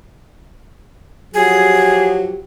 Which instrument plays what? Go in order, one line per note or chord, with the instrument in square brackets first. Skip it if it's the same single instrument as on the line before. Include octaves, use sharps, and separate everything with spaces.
[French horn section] F3 G4 [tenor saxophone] F#3 [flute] G#4